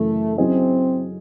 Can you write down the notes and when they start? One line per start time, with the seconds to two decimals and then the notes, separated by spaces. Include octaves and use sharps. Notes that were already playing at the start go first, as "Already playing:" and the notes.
Already playing: F#2 C#3 E3 A3
0.38 F#3 C4 C#4 E4 G#4 D#5